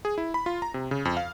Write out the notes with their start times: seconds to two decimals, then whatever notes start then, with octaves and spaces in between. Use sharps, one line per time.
0.05 G#4
0.18 E4
0.34 B5
0.46 F4
0.62 A#5
0.74 C3
0.91 C#3
1.05 F2
1.17 F5